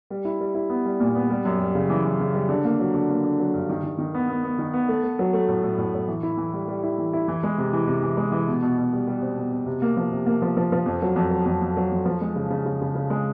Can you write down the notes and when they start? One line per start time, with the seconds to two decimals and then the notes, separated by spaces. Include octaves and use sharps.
0.10 G3
0.25 E4
0.40 G3
0.55 E4
0.70 B3
0.85 G3
1.00 A#2
1.15 B3
1.30 G3
1.45 F#2
1.60 G3
1.75 C#3
1.90 E3
2.05 E3
2.20 C#3
2.34 G3
2.49 D3
2.65 A#3
2.80 F#3
2.94 D3
3.09 A#3
3.24 D3
3.39 F#3
3.54 G2
3.70 D#3
3.83 D#3
3.98 D#3
4.14 B3
4.29 B3
4.44 B3
4.59 D#3
4.73 B3
4.88 A3
5.03 A3
5.19 F#3
5.33 A3
5.48 A2
5.63 A2
5.78 A2
5.94 A2
6.08 E3
6.23 E4
6.37 E3
6.53 G3
6.68 G3
6.83 E4
6.98 E3
7.13 E4
7.28 E3
7.43 G#3
7.58 C3
7.73 E3
7.87 C3
8.03 E3
8.17 G#3
8.32 E3
8.48 B2
8.62 B2
8.78 B2
8.93 G3
9.07 G3
9.22 C4
9.37 B2
9.52 B2
9.66 C3
9.82 A#3
9.97 F3
10.12 C3
10.26 A#3
10.42 F3
10.57 F3
10.72 F3
10.86 F2
11.02 F#3
11.16 F2
11.31 F#3
11.46 F2
11.62 F2
11.77 F#3
11.91 F2
12.05 F3
12.21 G#3
12.36 C#3
12.50 C#3
12.66 C#3
12.81 C#3
12.95 C#3
13.10 G#3